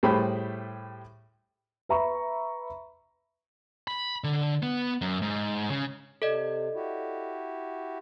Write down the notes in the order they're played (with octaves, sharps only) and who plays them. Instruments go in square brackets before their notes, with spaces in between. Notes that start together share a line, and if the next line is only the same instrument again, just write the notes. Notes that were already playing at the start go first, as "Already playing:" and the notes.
[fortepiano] A2 G3 A3 G#4 C5 B5
[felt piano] B4 E5 A#5 B5 C#6
[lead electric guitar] B5
D3
B3
F#2
G#2
C#3
[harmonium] C3 [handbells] A4 D5 D#5
[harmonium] E4 F#4 G4